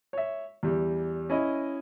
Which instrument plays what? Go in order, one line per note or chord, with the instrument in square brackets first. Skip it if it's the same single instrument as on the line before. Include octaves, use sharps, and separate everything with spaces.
[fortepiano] C#5 E5
E2 G3
C#4 E4 D#5